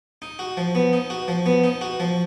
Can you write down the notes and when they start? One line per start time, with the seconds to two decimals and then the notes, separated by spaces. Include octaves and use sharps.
0.22 D#4
0.39 F#4
0.57 F3
0.75 B3
0.93 D#4
1.10 F#4
1.28 F3
1.46 B3
1.64 D#4
1.81 F#4
2.00 F3